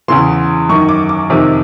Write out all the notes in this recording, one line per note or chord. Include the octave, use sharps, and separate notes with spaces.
E2 C#3 E3 C6
F#2 D#3 C#6
D6
D6
F2 C3 D#3